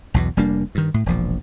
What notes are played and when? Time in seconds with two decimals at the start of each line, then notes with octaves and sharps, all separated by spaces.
0.14 B1 E2 B2
0.37 F1 G3 A#3 D4
0.75 G2 D#3
0.94 A2
1.06 E1 A#1 F3